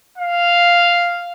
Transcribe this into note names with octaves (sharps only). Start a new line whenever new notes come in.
F5